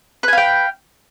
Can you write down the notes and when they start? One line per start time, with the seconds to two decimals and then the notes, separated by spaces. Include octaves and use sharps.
0.23 B4
0.28 G#5
0.33 F5
0.37 G5